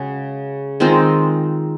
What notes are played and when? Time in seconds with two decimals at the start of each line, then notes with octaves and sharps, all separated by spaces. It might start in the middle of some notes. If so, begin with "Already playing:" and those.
Already playing: C#3 G#3 F#4
0.80 D#3 G#3 C4 F4